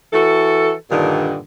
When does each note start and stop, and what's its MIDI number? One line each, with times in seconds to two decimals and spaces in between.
0.13 0.73 52
0.13 0.73 66
0.13 0.73 69
0.90 1.38 43
0.90 1.38 46
0.90 1.38 50
0.90 1.38 51